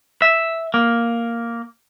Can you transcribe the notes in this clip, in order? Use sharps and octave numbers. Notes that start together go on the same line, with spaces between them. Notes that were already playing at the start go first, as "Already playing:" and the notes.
E5
A#3